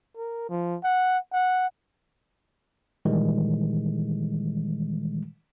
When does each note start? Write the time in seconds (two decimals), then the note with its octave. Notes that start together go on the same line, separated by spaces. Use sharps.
0.17 A#4
0.50 F3
0.84 F#5
1.33 F#5
3.05 A#2 D#3 E3 G3 G#3